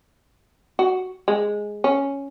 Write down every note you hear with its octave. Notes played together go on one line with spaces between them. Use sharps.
F#4
G#3
C#4